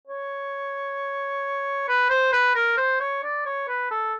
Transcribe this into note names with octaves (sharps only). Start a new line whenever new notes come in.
C#5
B4
C5
B4
A#4
C5
C#5
D5
C#5
B4
A4